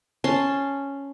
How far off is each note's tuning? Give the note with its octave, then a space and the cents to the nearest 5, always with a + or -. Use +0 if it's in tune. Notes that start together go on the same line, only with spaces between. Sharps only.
C#4 +0 A5 +0 C6 +0